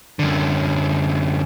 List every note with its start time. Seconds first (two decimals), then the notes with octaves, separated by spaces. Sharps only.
0.19 F#2 D3